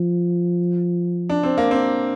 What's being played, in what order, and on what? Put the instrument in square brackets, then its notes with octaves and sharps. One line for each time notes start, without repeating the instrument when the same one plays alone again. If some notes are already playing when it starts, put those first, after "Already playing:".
Already playing: [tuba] F3
[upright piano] D4
C4
A#3
C4